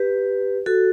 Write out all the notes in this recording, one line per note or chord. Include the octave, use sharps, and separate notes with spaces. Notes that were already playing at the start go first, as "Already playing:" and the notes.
Already playing: G4 B4
F#4 A4